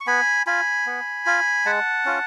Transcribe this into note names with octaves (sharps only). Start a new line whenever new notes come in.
C#6
B3 G#5 B5
F4 G#5 B5
B3
F4
G#3 F#5 A5
C#4 F4